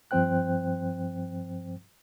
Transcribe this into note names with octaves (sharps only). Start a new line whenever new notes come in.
G2 F3 C4 C5 G5 F#6